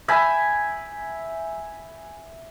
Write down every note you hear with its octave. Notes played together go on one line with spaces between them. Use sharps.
E5 G5 G#5 B5